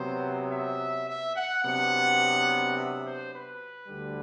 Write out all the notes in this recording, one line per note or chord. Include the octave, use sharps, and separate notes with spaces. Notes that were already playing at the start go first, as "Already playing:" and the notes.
Already playing: C3 F#3 B3 C5
E5
E5
F#5
C3 F#3 B3 D4 F#5
E5
C5
B4
D2 D3 G3